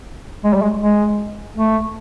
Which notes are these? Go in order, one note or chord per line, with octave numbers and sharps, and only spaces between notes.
G#3
G3
G#3
G#3
A3